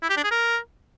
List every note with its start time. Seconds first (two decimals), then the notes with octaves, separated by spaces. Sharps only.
0.02 E4
0.09 G4
0.17 D4
0.24 G#4
0.31 A#4